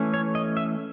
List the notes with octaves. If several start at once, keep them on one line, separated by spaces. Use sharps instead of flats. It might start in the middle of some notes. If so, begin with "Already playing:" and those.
Already playing: E3 A3 C#4
C#5
D#5
E5